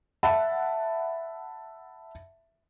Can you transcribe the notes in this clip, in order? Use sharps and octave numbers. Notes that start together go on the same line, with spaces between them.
E5 F#5 A5 B5